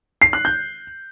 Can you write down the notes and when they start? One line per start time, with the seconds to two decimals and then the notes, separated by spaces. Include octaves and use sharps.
0.22 C7
0.33 F#6
0.45 G6